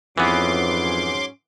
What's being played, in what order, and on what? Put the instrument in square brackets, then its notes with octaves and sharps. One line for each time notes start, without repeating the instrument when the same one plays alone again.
[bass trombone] F2 [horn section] G#2 F#3 C#4 [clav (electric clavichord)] E3 B3 [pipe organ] C6 D6